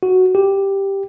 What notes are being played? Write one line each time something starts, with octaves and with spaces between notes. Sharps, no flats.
F#4
G4